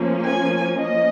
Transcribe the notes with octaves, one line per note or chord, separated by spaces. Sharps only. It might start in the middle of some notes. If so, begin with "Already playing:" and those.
Already playing: F3 A#3 C#4
G#5
D#5